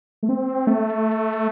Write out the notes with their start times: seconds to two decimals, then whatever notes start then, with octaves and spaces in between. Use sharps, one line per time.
0.23 A3
0.29 C4
0.67 A3